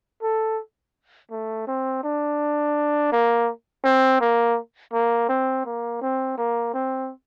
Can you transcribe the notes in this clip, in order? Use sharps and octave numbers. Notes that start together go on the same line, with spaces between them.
A4
A3
C4
D4
A#3
C4
A#3
A#3
C4
A#3
C4
A#3
C4